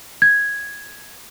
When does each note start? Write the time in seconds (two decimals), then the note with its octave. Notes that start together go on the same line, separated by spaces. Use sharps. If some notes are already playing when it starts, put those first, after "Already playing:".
0.22 G#6